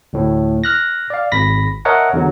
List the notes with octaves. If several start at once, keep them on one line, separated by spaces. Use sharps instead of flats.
D2 A2
F6 F#6 A#6
D5 F5
G#1 B5 A#6 B6
A#4 C#5 D#5 E5 F#5 A5
E2 D3 F#3